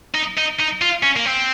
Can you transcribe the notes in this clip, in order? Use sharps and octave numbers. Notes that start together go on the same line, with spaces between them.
D#4
D#4
D#4
F4
C#4
A#3
C4